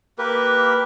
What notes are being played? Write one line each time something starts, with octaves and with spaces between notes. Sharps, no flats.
A#3 G4 A#4 B4